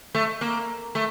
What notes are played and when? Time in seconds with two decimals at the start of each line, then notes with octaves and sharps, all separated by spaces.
0.15 A3
0.41 A#3
0.95 A3